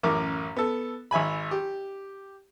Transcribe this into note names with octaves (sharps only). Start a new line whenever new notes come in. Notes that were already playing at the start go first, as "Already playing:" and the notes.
A1 F#2 A#4 D6
B3 A4
G#1 E5 G#5 B5
G4